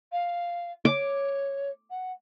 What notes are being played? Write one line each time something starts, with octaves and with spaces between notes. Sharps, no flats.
F5
C#5 D6
F#5